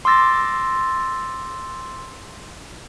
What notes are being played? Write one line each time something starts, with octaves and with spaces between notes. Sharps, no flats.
C6 D6 E6 A6 A#6